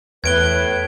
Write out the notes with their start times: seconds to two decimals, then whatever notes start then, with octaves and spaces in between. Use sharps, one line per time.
0.24 E2 A2 B4 G#6 D7 G7